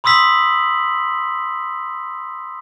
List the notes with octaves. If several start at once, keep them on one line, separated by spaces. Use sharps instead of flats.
B5 C6 D#6 E6 B6 F#7